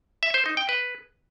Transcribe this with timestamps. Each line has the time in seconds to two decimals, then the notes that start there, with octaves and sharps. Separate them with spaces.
0.23 E5
0.34 C5
0.46 D#4
0.57 G5
0.69 B4